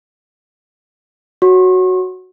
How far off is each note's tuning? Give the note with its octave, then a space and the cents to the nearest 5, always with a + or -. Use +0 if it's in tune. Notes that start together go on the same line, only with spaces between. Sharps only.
F#4 +0 C#5 +0 C#6 -40